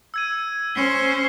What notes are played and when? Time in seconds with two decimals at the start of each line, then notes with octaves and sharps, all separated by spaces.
0.14 E6 G#6 D#7
0.75 C#4 C5 C7 G7